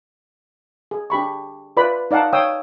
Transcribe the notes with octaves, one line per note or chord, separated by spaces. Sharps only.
G#4
D4 G4 B5 C#6
F4 B4 D5 B5
D#4 D5 F5 F#5 A5
C#5 F5 G5 D#6 E6